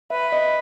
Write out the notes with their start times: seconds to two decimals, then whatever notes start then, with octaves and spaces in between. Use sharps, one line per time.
0.10 B4 E5
0.32 D#5